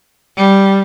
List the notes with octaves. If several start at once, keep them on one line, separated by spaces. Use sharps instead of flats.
G3